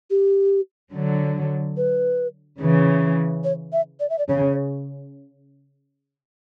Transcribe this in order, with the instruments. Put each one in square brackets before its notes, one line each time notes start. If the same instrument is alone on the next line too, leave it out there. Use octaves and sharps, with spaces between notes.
[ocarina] G4
[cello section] D3 F#3
[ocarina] B4
[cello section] C#3 E3
[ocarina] C#5
E5
D5
E5
D5
[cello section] C#3 [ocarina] C#5